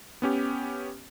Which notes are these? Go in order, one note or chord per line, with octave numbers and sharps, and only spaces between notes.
B3 C#4 G4